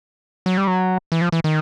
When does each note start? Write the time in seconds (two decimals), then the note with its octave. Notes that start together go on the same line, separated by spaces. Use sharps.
0.46 F#3
0.57 G3
0.67 F#3
1.12 E3
1.21 F3
1.32 E3
1.44 D#3